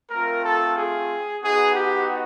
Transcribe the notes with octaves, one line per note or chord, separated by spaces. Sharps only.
A3 C4 F4 A#4
A4
G#4
B3 D#4 F#4 G#4
G4